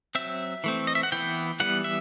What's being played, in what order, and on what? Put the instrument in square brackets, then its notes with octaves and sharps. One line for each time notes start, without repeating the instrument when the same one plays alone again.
[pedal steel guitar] F#3 C4 E5
E3 A3 C4
D#5
E5
F#5
E3 B3 G5
E3 G3 B3 F#5
E5